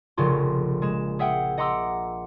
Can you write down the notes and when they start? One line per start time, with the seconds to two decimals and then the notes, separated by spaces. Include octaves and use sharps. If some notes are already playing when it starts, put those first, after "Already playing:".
0.17 F1 A#1 C#3 F4 C6
0.82 G#3 E7
1.19 G#4 E5 F#5 G5
1.57 D#5 F#5 A#5 C6 D6 E6